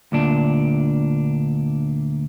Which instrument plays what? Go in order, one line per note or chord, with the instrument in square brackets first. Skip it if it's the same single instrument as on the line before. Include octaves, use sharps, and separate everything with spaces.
[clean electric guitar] D2 A#2 D4